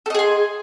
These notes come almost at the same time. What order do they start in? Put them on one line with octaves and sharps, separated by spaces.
A4 D#5 G#4 C6